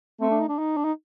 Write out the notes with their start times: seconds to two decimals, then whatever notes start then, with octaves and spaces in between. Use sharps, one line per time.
0.21 A3 C4
0.31 D4
0.40 D#4
0.49 D4
0.59 D#4
0.77 D4
0.85 D#4